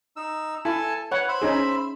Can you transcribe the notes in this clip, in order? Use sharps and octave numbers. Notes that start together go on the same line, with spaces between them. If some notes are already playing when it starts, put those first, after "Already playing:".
D#4 E6
E4 A4 G#5 A5
B4 C#5 F#5
C5 E5 B5
C#4 D#4 G#4